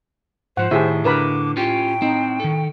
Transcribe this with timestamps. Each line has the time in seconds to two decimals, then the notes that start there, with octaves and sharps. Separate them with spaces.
0.57 G#2 F3 C5 F#5
0.71 A2 D#3 G4 G#4 E5
1.05 D3 A#4 B4 B5 D6
1.57 C#4 F4 G4 G5
2.02 C4 D#4
2.40 D#3 A4